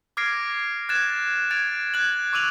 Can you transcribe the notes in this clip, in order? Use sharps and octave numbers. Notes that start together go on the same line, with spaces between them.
D6 F6 G#6 A#6 C7 D7
F#6 G#6 A6 E7
G#6 A6 D7 F7
F#6 G#6 F#7
C#6 D6 E6 D#7 F7 F#7